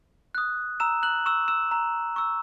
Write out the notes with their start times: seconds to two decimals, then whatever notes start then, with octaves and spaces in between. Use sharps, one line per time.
0.35 D#6 F#6
0.80 A#5 E6 E7
1.03 F#6 F#7
1.26 C#6 E6 E7
1.48 E6 E7
1.71 A#5
2.16 C#6 E6